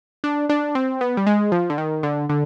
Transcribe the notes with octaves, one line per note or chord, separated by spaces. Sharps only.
D4
D4
C4
B3
G3
G#3
F3
D3
D#3
D3
D3